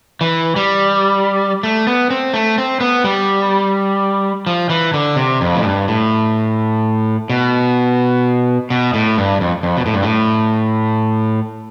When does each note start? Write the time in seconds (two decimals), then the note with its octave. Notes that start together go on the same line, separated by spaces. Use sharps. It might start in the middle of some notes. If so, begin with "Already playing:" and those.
0.21 E3
0.56 G3
1.63 A3
1.87 B3
2.10 C4
2.33 A3
2.58 C4
2.81 B3
3.04 G3
4.47 F3
4.70 E3
4.94 D3
5.16 C3
5.41 F2
5.55 A2
5.64 G2
5.88 A2
7.30 B2
8.70 B2
8.94 A2
9.18 G2
9.41 F2
9.63 F2
9.77 B2
9.86 A2
9.94 G2
10.03 A2